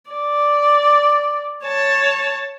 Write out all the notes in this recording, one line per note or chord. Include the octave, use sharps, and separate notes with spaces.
D5
C#5 A5